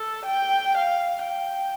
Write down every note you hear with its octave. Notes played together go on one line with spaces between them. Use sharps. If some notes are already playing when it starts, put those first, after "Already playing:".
Already playing: A4
G5
F5
G5